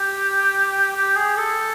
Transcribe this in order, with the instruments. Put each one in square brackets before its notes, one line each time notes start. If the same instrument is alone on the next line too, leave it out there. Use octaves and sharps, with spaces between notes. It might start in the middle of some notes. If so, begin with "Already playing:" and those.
Already playing: [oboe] G4
G4
G#4
A4